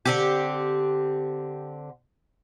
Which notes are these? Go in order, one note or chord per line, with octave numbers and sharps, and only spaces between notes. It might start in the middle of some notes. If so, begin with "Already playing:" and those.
D3 C4 G4